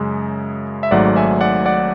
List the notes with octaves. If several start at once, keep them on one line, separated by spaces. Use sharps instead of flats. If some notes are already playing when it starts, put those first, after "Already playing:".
Already playing: F#2 C#3 G#3
E5
G#1 G#2 F#3 A3 D5 F#5
E5 G#5
D5 F#5
D5 F#5